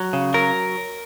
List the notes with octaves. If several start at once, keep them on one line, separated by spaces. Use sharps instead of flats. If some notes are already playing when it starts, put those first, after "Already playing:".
Already playing: F#3
C#3
F#3 A#4